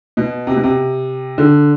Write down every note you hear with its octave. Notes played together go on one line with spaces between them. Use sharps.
B2
C3
B2
C3
D3